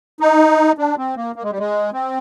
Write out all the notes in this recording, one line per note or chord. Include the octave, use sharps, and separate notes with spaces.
D#4
D4
C4
A#3
A#3
G#3
G3
G#3
C4